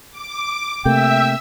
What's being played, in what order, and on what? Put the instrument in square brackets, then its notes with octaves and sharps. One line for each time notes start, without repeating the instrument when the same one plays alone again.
[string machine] D6
[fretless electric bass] C3 A3 A#3 [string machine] E5 E6 [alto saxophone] G5